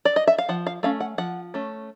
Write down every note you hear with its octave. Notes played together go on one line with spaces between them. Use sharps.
D5
D#5
E5
F5
F3 F#5
F5
A3 C#4 F5
F#5
F3 F#5
A3 C#4